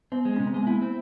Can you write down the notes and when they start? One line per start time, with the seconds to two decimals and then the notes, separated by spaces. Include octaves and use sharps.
0.12 B3 C4
0.25 G#3
0.36 C3 C#4
0.47 C4
0.54 G#3 B3
0.67 A#3 E4
0.82 C4